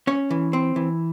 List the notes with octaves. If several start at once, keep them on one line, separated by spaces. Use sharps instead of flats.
C#4 C#5
E3
C4
E3